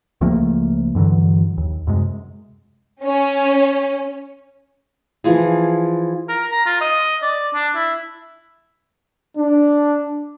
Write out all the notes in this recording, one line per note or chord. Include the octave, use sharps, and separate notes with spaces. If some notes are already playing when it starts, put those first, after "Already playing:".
C#2 F3 A3 A#3
G2 D3 E3 F#3
D#2
F#2 C3 G#3
C#4
E3 F3 F4 G#4
A#4
A#5
F4
D#5
D5
D4
E4
D4